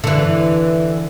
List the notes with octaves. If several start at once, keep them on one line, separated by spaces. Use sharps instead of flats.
D3 E3